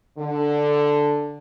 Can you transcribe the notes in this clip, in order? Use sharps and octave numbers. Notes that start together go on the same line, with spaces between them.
D3